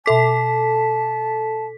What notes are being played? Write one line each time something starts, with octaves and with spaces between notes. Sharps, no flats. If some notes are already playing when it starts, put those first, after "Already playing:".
B2 A4 E5 A5 D6 B6